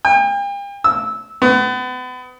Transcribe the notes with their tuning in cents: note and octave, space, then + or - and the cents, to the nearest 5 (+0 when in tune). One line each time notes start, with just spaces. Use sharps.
G5 +40
E6 -15
B3 +35